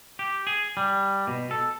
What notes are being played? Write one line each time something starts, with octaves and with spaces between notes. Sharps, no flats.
G4
G#4
G3
B2
A4